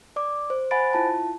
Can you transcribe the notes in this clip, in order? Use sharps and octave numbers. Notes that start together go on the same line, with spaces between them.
D5 D6
C5
C5 F#5 G#5 B5 A6 D7
E4 F4 A5